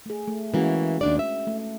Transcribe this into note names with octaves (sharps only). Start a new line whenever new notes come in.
A3 G#4
A3
E3 G#3 A#3 C#4 F#4
D#2 D4 D5
E5
A3